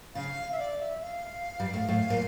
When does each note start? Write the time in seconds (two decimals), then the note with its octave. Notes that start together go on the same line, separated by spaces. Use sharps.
0.15 C#3 F5
0.52 E5
0.59 D5
0.80 E5
1.02 F5
1.59 G2 G3
1.73 A2 A3
1.89 A2 A3
2.10 A#2 A#3